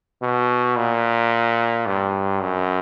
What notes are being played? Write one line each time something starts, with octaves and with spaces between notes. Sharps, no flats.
B2
A#2
G2
F#2